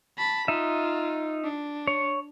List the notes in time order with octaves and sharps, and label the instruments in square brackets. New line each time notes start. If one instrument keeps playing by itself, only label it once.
[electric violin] A5 B5
[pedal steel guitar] D#4 E5 [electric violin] F4
[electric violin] D4
[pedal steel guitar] C#5